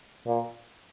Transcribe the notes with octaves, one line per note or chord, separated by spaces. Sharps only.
A#2